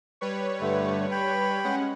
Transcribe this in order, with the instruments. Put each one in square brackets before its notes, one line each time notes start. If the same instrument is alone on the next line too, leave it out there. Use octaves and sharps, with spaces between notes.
[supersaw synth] G3 B4 C#5
[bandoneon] G2 D3 A3
G5 B5
[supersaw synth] G#3 C#4 F#5